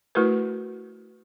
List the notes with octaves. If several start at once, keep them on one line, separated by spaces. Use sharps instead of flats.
A3 E4 F#4 A#4 B4